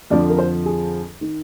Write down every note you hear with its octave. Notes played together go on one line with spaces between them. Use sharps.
F2 D3 F3 D5
A#4
C5
G#4
D#3